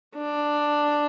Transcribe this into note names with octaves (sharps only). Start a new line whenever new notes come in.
D4